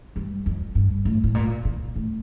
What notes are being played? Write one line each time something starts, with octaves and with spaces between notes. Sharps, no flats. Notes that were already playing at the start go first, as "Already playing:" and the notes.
G2
F2
G2
A2
A2
A#2
A#2
A2